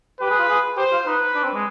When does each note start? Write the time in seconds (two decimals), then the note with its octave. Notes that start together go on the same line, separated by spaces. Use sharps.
0.20 G4 B4
0.30 G#4
0.39 F4
0.49 G#4
0.77 G4 C5
0.92 F4
1.06 D#4 B4
1.35 D4
1.43 C4
1.54 G#3